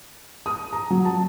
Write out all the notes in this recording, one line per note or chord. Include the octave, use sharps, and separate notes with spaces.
D#6
A#5
F#3
A5